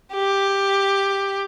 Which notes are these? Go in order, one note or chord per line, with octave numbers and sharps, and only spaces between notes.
G4